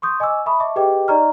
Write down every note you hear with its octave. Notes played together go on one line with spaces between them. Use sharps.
C6 C#6 D#6 G6
D#5 G#5 C#6 D6 E6
E5 A5 B5 C#6 D#6
D#5 E5 A5 C#6 D6
G4 G#4 B4 D#5 G5 D6
D#4 D5 D#5 A#5 C#6 F6